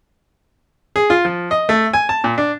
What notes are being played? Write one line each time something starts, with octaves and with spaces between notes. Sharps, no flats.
G#4
F4
F3
D#5
A3
G#5
A5
A#2
D4